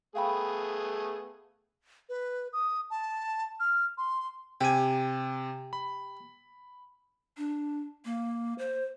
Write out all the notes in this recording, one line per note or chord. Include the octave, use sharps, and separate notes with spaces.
A3 B3 G#4 F5 G5 B5
B4
D#6
A5
F6
C6
C3 G4 G#5 D#7
B5
D4
A#3
C5